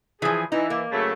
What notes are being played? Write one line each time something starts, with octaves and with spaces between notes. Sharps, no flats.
E3 F3 G#4
E3 D#4
A#3
C#3 F#3 A3